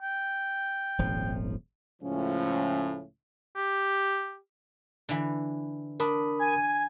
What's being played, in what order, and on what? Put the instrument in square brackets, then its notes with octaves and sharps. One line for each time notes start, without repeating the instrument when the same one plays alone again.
[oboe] G5
[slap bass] D#1 G#1 F3
[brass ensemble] C#2 A2 F3 C#4
[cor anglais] G4
[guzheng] D3 E3
[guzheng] D4 [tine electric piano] A#4 B5 D#6
[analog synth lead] G#5